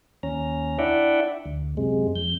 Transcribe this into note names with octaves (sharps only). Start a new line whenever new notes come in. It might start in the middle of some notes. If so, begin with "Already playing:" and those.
D#2 C#4 A#5
D4 E4 D5 E5 F#5 G5
D2
F#2 C3 G#3
F2 G6